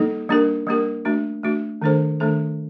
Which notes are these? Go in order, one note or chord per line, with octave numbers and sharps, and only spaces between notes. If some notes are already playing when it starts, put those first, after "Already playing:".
Already playing: G3 A#3 D#4 A4
G3 A#3 D4 G4 A#4
G3 A#3 D4 G4 A#4
A3 D4 F#4
A3 D4 F#4
D#3 A3 D4 A4 C5
D#3 A3 D4 A4 C5